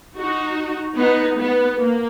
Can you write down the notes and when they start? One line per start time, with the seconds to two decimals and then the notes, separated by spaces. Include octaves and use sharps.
0.17 D#4 F#4
0.98 B3 D#4
1.38 B3
1.79 A#3